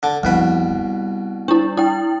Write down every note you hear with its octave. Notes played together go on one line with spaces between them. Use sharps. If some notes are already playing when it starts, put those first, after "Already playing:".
D3 A5
C2 F2 B2 B4
G3
D4 E4
E4 G5